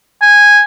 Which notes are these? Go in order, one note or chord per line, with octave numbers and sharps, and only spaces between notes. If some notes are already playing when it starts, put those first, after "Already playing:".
G#5